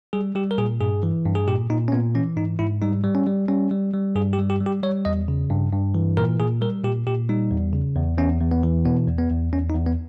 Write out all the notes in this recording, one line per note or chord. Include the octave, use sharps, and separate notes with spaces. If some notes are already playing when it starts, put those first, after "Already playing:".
G3 G#4
G3 G4
A#4
A#2 G#4
G2 G#4
E3
G2
G#4
A#2 G4
A#2 D#4
C#4
A#2 B3
E3 C#4
G#2 D#4
G#2 E4
G3 D#4
G3
C#4
G3
G3 C#4
G3
G3
G2 G#4
G4
G3
G4
G3
G4
G3 C#5
E2 D#5
C#3
G2
G2
E3
A#2 A#4
A#2 G#4
G3 A#4
A#2 G4
A#2 G4
G3 D#4
E2
C#3
E2
E2 C#4
E2
B3
E3
B2 B3
E2
B3
E2
E2 C#4
D#4
E2
B3